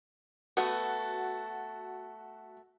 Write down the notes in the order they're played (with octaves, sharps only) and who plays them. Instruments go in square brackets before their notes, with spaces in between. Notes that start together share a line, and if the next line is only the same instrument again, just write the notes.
[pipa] A3 B3 [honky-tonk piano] F#4